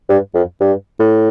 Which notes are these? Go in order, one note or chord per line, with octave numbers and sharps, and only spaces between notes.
G2
F2
G2
A2